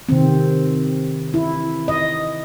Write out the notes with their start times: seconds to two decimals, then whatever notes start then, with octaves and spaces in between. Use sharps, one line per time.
0.09 C3 D#3 C4
1.34 E4
1.88 D#5